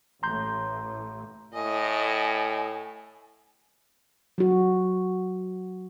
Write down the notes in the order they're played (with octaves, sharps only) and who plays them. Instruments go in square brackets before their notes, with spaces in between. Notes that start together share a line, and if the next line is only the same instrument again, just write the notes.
[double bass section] A1 A2 [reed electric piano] A#5 C6 G6
[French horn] A2 [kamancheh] D#5 [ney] G#5
[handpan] F#3 F#4